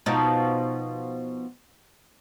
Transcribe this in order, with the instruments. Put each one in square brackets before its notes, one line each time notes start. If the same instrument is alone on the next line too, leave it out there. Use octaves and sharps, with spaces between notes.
[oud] B2 F3 D#4